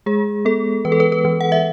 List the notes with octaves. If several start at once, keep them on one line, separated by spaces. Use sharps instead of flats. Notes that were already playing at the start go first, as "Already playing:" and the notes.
G#3 G#4
B3 A4
E3 B4
A4
B4
B4
E3
F#5
E5